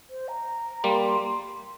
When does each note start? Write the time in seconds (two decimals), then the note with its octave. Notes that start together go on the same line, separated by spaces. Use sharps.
0.10 C5
0.28 A#5
0.84 G3 A#3 C6